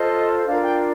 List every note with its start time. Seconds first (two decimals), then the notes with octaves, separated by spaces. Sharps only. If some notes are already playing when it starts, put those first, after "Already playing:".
Already playing: F4 A4 C5 D#5
0.47 D4 F4 A#4 F5
0.63 G5